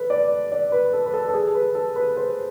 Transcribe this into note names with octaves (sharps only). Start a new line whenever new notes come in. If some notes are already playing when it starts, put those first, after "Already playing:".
Already playing: A4 B4
D5
D5
B4
A4
B4
A4
A4
G#4
B4
A4
B4
C5